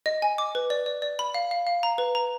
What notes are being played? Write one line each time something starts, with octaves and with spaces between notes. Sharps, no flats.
D#5
G#5
D6
B4
D5
D5
D5
B5
F5
F5
F5
A#5
B4
A#5